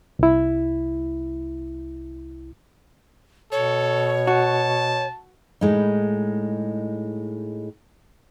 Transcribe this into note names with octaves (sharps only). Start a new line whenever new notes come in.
C2 E4
B2 A4 C#5
F#4 A5
A2 G#3 D#4